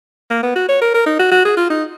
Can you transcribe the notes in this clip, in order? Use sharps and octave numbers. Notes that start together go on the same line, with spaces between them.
A#3
B3
F#4
C#5
A#4
A#4
D#4
F#4
F#4
G#4
F4
D#4